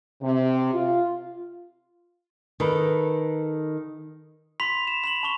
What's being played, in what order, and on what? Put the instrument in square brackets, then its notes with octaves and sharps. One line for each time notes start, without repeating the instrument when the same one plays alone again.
[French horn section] C3
F4
[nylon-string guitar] D#3 A4 B4
[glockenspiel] B5 C6 B6 F7
E7
B5 F7 F#7
A5 C6 C#6 G7